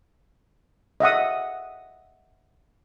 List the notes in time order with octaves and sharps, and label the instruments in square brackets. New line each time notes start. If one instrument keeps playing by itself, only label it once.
[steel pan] D#5 E5 F#5 D#6